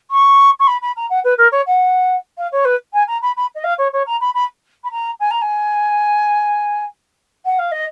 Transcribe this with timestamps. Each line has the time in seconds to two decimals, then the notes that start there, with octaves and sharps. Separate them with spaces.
0.11 C#6
0.59 C#6
0.67 B5
0.81 B5
0.96 A#5
1.10 F#5
1.24 B4
1.37 A#4
1.51 C#5
1.67 F#5
2.37 F5
2.52 C#5
2.65 B4
2.93 G#5
3.07 A#5
3.22 B5
3.36 B5
3.55 D#5
3.64 F5
3.78 C#5
3.93 C#5
4.06 A#5
4.21 B5
4.34 B5
4.84 B5
4.91 A#5
5.20 G#5
5.30 A#5
5.41 G#5
7.45 F#5
7.58 F5
7.71 D#5